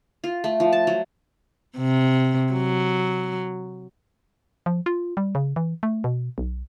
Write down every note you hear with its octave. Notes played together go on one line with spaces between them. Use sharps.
F4
A3
F3
A5
F#3
C3
F#3
F3
F4
G3
C#3
E3
A3
B2
B1